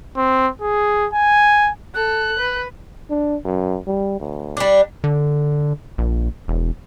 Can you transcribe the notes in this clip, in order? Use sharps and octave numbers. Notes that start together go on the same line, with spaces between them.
C4
G#4
G#5
A4 F#6
B4
D4
F#2
G3
D2
G3 D4
D3
A#1
E1